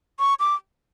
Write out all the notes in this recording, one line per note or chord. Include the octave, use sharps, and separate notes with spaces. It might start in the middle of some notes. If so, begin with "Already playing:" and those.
C#6
D6